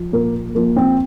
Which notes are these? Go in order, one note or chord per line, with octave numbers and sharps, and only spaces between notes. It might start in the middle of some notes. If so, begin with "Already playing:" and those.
Already playing: F3
A#2 A#3
F3 A#3
C4